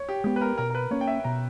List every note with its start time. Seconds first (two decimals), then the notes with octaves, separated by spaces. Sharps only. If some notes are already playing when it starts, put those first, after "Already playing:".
Already playing: C#5
0.09 G4
0.24 G#3 B3 G4
0.36 B4
0.41 A#4
0.58 B2 A#4
0.70 A#4
0.75 B4
0.91 A#3 C#4 C#5
1.01 G5
1.07 E5
1.24 B2 A#5